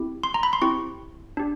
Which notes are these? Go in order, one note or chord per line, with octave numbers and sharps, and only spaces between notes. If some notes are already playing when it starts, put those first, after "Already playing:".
Already playing: C4 E4 G4
C6
A#5
B5
C6
C4 E4 G4 C#6
D4 G4